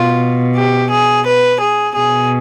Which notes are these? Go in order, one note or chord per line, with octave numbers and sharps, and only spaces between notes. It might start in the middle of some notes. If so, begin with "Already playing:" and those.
Already playing: B2 F4
G4
G#4
B4
G#4
B2 G#4